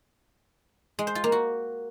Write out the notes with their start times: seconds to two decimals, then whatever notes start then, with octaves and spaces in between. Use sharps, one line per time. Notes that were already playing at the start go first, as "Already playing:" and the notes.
0.99 G#3
1.07 C5
1.15 F4
1.24 A#3
1.32 F#4